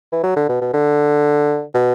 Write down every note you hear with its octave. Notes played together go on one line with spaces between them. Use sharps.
E3
F#3
D3
B2
B2
D3
B2